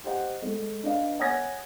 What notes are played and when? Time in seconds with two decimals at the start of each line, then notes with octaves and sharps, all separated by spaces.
0.04 G4 C5 D#5 F#5
0.42 G#3 A3
0.83 D4 B4 D#5 F5
1.19 C#5 F#5 G#5 D#6 G#6 A#6